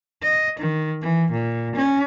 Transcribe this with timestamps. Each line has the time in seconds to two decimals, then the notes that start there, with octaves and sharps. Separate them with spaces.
0.22 D#5
0.59 D#3
1.01 E3
1.31 A#2
1.75 C#4